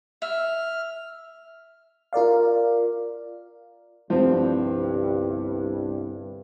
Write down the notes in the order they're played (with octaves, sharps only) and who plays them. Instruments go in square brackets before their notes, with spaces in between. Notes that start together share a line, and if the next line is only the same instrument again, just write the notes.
[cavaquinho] E5 [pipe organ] F6
[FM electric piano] F4 A#4 D5 F5
[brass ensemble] G1 C2 G2 [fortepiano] F3 C4